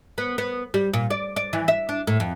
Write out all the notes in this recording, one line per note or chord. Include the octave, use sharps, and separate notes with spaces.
B3
B3
G3
A#2
D5
D5
E3
E5
D4
A2
F2